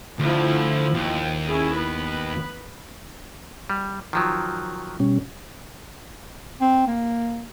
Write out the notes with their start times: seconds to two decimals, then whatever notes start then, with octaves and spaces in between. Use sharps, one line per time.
0.19 D2 F3 E4
0.94 D#2
1.48 C#4 E4 G#4
1.77 B3 B4
3.70 G3
4.13 D#3 F3 F#3
5.00 B2 G3 C#4
6.61 C4
6.87 A#3